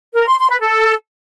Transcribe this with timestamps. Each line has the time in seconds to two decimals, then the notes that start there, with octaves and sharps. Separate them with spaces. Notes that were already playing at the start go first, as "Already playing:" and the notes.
0.15 A#4
0.27 C6
0.38 C6
0.50 B4
0.62 A4